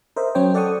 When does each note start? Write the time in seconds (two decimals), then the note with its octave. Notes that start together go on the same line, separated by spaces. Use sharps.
0.16 A#4 C5 D#5 E5
0.35 F#3 C#4 C5 C#5 G5
0.54 A4 D5 F#5 G5 C#6 D#6